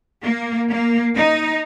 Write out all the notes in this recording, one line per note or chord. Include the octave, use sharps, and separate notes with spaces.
A#3
A#3
D#4